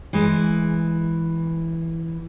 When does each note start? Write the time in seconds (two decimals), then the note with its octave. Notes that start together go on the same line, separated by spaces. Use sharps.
0.13 E3 G#3